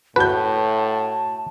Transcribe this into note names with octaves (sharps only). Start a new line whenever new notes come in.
A2 F#4 B4 A5 G6